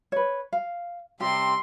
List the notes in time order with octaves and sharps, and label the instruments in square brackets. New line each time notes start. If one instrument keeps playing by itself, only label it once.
[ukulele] B4 C#5
F5
[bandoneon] C3 G3 C4 [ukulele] G4 [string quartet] C6